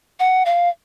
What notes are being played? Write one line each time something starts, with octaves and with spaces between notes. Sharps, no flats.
F#5
F5